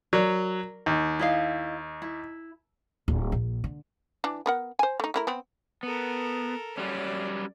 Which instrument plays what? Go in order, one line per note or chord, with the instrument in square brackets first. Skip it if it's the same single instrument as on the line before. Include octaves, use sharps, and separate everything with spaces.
[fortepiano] F#3 [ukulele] A#4 D5
[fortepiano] D#2
[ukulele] E4 D#5 F5
E4
[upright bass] D1
A#1
D3
[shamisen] E3 D4
B3 A#4 F#5
C5 G#5
A3 D#4
A3 E4 A#4
B3 C4
[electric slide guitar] B3 [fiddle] A4 A#4
[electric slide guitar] F#3 G3 C#4 [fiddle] D5